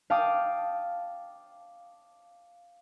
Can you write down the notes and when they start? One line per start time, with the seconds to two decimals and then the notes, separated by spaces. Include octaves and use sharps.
0.10 F5 G5 A5 D6 D#6